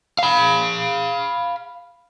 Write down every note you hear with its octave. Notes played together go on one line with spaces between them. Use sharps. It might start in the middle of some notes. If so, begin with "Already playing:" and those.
F5 B5